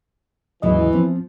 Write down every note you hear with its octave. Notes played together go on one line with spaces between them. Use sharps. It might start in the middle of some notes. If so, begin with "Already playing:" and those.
D#2 G#2 C#3 E3 F#3 D#5
F3 B3 C4